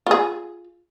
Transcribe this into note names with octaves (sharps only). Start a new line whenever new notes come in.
F4 G#4